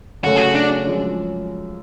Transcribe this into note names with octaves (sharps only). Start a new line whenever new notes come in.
F#2 C#3 F#3 A3 C#4 F#4
G#4
F#4
D4
F#2 F3 G#3